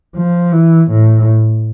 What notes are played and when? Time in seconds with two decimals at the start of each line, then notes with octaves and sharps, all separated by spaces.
0.15 F3
0.52 E3
0.90 A2